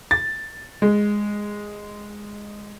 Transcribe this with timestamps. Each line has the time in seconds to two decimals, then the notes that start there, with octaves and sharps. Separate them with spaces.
0.11 A6
0.82 G#3